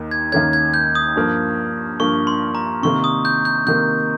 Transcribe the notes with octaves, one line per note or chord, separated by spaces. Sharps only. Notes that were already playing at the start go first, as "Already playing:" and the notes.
Already playing: D#2 D#3 A#3
G#6
D#2 D#3 A#3 C#4 G#6
G#6
G6
D#6
G2 F3 A#3
G2 F3 A#3 C#6
C6
A#5
C3 D#3 A#3 C#6
D#6
G6
G6
C3 D#3 A#3 G6